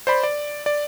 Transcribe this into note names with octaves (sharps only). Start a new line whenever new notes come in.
C5 D5 B5
D5
D5